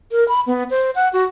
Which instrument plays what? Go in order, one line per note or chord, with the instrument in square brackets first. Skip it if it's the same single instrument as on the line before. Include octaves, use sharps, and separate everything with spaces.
[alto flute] A#4
B5
B3
C5
F#5
F#4